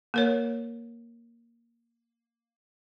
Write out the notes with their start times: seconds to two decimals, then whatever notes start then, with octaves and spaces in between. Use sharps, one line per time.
0.14 A#3 A#4 C#5